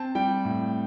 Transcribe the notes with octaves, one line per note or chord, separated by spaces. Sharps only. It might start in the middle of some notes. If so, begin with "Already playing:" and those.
Already playing: C4 A5
G3 G5
A2